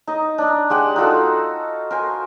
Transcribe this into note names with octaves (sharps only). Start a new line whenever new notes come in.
D#4 D#5
D4 D#4
G#3 G4 F#5
D#4 F4 F#4 A4
A#4 C5 G#5